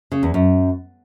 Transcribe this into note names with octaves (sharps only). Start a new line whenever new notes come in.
C#3
E2
F#2